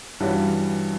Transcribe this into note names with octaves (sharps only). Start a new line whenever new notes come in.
G2 E3 G3 C#4 F#4